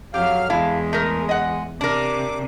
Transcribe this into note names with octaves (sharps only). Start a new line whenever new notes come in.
F2 F#3 G4 F5 F6
E2 G#3 E4 F5 A5
A3 A#4
D#5 F#5
C3 D4 A#4 D6